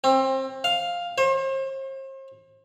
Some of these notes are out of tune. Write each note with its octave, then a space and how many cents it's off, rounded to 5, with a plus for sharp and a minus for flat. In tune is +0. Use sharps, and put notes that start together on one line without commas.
C4 +25
F5 +5
C5 +40